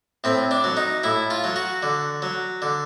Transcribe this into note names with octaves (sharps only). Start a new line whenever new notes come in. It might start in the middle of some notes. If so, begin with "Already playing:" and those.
A2 C4
D4
F#3
D#4
A2 E4
F4
F#3
F#4
D3
F#3
D3